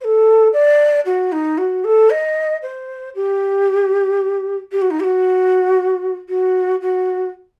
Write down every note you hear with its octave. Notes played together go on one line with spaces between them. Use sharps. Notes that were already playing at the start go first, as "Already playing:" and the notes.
C5
A4
D5
F#4
D#4
F#4
A4
D#5
C5
G4
G4
F#4
D#4
G4
F#4
F#4
F#4